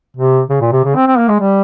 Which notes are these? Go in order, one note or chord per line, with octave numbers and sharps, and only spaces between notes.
C3
C#3
A#2
C3
C#3
C4
C4
A#3
G#3
G3